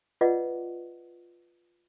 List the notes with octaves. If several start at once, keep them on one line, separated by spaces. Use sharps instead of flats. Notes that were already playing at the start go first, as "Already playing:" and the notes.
F4 B4 D5 D#5 F#5 D6